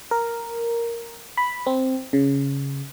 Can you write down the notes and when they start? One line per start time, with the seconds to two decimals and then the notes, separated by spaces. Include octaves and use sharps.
0.11 A#4
1.37 B5
1.66 C4
2.13 C#3